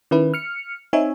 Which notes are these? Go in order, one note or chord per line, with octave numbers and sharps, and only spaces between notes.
D#3 C#4 E4 B4
F6 C#7
C4 D#4 C#5 E5 G#5